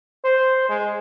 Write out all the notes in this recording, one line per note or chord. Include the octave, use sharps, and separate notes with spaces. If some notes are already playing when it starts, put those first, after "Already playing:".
C5
G#3